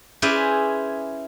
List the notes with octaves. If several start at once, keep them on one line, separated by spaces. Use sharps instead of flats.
C#4 E4 G#4 B4 C5 D5